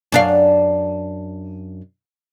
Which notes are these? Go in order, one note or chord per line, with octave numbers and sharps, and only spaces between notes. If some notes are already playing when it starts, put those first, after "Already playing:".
F#2 D4 F5